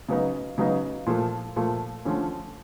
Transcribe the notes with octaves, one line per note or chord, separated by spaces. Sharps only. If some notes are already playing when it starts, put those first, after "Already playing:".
C#3 F#3 B3 D#4
C#3 F#3 B3 D#4
A#2 F3 A3
A#2 F3 A3
D3 F3 A3 C#4